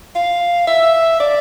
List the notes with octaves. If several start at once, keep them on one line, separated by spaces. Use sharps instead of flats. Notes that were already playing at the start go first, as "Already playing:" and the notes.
F5
E5
D5